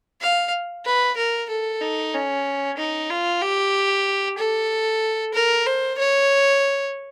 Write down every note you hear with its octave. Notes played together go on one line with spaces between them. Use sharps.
F5
B4
A#4
A4
D#4
C#4
D#4
F4
G4
A4
A#4
C5
C#5